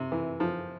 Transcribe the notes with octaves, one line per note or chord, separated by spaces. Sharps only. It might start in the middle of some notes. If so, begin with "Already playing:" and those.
Already playing: C3
E3
F3